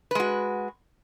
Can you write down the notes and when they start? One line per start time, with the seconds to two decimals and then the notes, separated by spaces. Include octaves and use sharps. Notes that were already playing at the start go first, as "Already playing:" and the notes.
0.11 B4
0.15 G#3
0.20 F#4